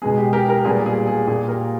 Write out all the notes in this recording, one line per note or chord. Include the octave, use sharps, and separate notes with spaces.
B2 G#3 B3 G#4
G4
G4 A#4
G4 A#4
A#2 G3 B3 G#4
G#4
G#4
A#2 A#3 G#4
G4 A#4